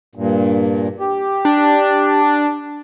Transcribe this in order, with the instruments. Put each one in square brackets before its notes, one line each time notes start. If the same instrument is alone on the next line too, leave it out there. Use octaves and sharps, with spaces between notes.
[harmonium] G2 A#2
G4
[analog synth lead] D4